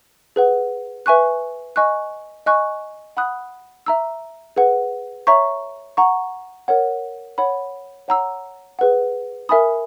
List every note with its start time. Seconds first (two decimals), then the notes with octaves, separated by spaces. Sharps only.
0.36 G#4 B4 F#5
1.06 B4 E5 G#5 C#6 F#6
1.76 D#5 G#5 C#6 F#6
2.46 D#5 G#5 C#6 F#6
3.17 F#5 B5 D#6 F#6
3.86 E5 A#5 E6
4.56 G#4 B4 F#5
5.27 C#5 E5 A#5 C#6
5.97 F#5 A#5 C#6
6.68 A#4 C#5 F#5
7.38 C#5 F#5 B5
8.08 C#5 F#5 A#5 E6
8.79 G#4 B4 F#5
9.49 A#4 E5 G#5 B5 D#6